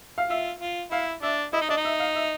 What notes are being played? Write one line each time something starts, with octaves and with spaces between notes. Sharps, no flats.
F5
F4 E5
F4
E4 F5
D4 E5
E4 D#5
D#4
D4 D#5
D#4
E5
F5
E5